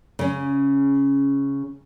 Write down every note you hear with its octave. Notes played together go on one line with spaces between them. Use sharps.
C#3 C#4